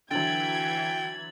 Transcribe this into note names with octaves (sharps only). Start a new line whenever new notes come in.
D3 E3 F#3 G5 G#6 A6 F#7